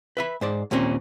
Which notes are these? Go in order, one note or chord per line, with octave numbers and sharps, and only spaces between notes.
B4 E5 B5
G#2 C5 D5
D#2 A#2 A#3 C4 C#4